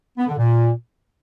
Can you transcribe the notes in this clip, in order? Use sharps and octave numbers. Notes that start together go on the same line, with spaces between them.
B3
D3
A#2